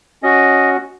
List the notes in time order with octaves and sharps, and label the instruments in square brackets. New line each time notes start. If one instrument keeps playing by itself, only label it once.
[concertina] C#4 F#4 D#5